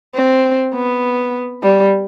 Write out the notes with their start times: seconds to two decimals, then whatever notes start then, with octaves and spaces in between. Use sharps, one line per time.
0.15 C4
0.74 B3
1.63 G3